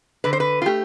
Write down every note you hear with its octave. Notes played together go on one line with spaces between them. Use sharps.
D3 B4
C5
B4
F4
A3 G4